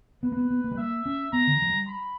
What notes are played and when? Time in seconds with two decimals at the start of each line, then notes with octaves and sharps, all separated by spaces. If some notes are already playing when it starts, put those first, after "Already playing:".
0.23 B3 B4
0.32 A#3
0.37 B3
0.50 B3
0.64 A#3
0.71 G3
0.78 A#3 E5
1.06 C#4
1.33 B3 A#5
1.47 D3
1.54 E3
1.62 F#3
1.69 G3
1.88 B5